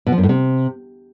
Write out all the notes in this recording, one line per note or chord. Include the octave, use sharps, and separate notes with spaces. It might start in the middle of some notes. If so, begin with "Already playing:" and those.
B2
F3
F#2
A2
C3